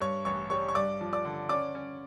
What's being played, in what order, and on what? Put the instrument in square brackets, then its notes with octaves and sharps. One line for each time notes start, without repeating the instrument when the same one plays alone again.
[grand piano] G2 C#5 C#6
A1 C#5 C#6
G3 C#5 C#6
C#6
G2 D5 D6
F3
D5 D6
D3
C#4 D5 D6
C#4